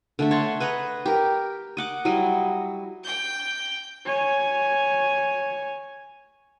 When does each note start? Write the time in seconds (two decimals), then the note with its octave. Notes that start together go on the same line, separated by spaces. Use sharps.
0.19 D3 A3 E5
0.31 C#5 F#5 A5 C6
0.60 B4 D#5 F#5 A#5
1.06 G4 A#4
1.77 D#5 F#5 D6
2.05 F#3 G3 E4 D#5
3.04 G5 G6
4.05 C#5 G#5